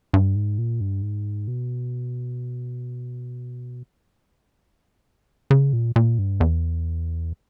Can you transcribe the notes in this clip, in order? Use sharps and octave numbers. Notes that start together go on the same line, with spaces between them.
G2
G#2
A#2
G2
G#2
B2
C#3
A#2
A#2
G2
E2